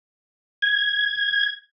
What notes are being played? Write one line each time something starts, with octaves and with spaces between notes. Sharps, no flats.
G#6